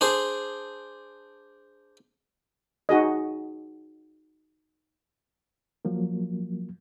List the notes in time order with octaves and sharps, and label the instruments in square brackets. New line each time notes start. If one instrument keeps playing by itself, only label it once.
[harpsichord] D4 G#4 C5
[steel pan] D#4 F#4 G#4 D#5
[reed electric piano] F3 F#3 A#3